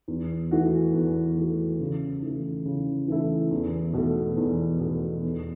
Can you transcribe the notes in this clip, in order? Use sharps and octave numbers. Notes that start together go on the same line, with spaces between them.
E2
E3 A3 F#4
E2
E3 A3 F#4
C#3
E3 A3 E4
C#3
E3 A3 E4
E2
B2 A3
E2
B2 A3
E2